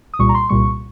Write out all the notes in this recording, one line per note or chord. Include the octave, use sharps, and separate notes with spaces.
D#6
C2 A#2 G3 C#6
A#5
C6
C2 A#2 G3 C#6